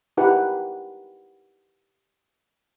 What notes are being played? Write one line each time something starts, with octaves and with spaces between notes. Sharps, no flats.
D#4 E4 G4 A#4 B4 F#5